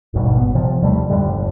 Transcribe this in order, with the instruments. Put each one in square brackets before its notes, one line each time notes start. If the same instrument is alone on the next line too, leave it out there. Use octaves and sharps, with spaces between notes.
[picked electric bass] D#1 G#1 G2 B2
B3
C3 F3
D#2 G3 A3
F2 A2 D3 G3
G1